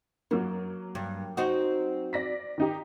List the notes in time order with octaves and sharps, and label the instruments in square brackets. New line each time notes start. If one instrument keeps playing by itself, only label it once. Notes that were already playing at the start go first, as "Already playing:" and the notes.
[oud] F#2 [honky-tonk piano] F#3 A#3
[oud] G2
C4 D#4 F#4
[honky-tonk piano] D5 A#6 B6
D#3 D#4 G4